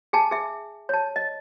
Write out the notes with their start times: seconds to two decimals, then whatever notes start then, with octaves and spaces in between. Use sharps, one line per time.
0.13 G#4 G#5 A5
0.31 G#4 E5
0.89 C#5 A5
1.16 D#5